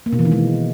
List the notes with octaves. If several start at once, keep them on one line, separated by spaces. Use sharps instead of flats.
A#3
B2
E3
D#3
G#3